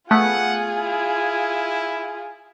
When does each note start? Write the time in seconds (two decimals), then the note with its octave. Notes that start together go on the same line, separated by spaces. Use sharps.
0.11 A3 B3 F4 G#4 F#5
0.74 E4